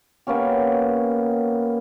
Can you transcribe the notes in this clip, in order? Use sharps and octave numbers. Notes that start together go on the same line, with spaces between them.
A#3 B3 C#4 G4